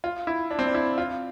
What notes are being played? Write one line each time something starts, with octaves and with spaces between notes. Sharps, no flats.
F4
E4
D4
C4
D4
E4
F4